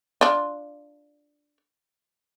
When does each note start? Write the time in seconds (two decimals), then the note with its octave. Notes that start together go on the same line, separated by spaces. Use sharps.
0.21 D4 F4